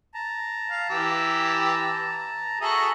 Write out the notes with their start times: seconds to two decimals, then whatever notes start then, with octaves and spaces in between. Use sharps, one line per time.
0.14 A5 A#5
0.70 F5
0.90 E3 G4 E6
2.61 F#4 G#4 A4 E5 A#5 D#6